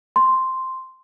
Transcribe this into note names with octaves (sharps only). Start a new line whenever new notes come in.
C6